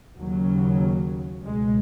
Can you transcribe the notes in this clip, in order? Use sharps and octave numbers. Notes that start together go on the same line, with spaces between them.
D#2 C#3 F#3
C#2 B2 G#3